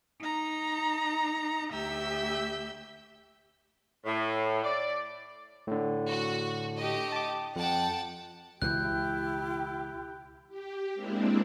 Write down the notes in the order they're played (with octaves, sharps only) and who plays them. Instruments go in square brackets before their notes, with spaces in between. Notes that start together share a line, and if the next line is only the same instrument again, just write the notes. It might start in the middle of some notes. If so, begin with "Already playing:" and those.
[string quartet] D#4 A#5
D2 G4 E5 E6 G6
[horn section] A2
D5
[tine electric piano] A2 D3
[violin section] F#4
A3 G4 D#5
[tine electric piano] A5 D6
[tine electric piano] F2 [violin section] F#5 G5 A5
[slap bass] C#2 B2 E3 [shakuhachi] E4 [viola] G4 G5 [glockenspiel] F#6 G6
[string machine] G4
G#3 A#3 C4 D4 E4